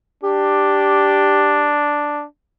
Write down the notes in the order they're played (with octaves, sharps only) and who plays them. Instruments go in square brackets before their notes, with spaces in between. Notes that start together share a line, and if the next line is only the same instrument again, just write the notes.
[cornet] D4 [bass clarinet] G4